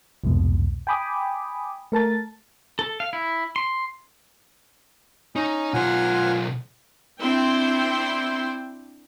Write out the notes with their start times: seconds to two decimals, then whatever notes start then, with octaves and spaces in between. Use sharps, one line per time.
0.24 C2 F2 G#2 B2
0.87 G5 G#5 B5 D6 D#6
1.92 A3 A#4 A5 A6
2.79 A4
3.00 F5
3.13 E4
3.56 C6
5.36 C#4 D#4
5.74 B1 F4 C5 F#5 G#5 F6
7.21 C4 D4 E4 G5 C6